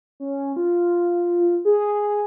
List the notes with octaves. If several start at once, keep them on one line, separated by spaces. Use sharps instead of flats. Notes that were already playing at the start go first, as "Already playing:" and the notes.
C#4
F4
G#4